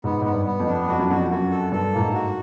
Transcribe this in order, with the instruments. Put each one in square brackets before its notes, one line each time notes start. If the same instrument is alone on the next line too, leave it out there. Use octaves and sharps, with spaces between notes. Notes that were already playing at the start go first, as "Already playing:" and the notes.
[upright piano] G#2 [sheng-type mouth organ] B3
[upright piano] G#2 [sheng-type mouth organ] B3
[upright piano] G2
[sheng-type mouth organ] B3
[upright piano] F2
[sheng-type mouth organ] D4
[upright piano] F2 [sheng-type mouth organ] F#4
[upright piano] F#2
[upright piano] F2 [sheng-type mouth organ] F#4
[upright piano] F#2 [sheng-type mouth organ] F#4
[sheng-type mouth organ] A4
[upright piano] G2 [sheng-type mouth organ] A4
[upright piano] A2 [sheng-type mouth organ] A#3
[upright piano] G#2
[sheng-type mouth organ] F#4